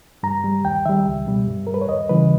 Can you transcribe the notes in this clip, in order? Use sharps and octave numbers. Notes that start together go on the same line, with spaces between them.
G2 A#5
G3
D#2 G5
D#3 G3 E5
C#2
B2 G3
G2
G3 A#4
B4
C#5
D#2 D#5
C#3 E3 G3 B4